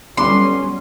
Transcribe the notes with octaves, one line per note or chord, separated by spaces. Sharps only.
G1 D2 F#3 G3 C#4 D4 C6 D6